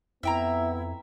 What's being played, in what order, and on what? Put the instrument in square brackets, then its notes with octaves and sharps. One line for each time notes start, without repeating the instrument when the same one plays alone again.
[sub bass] F2 [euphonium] B3 [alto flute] E4 [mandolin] E5 G5 A#5